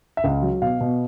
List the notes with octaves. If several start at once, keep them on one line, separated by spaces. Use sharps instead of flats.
E5
C#2 F5
F#3
B2 F5
B2